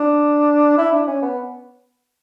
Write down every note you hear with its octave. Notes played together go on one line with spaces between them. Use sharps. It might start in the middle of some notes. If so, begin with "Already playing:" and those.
Already playing: D4
E4
D4
C#4
B3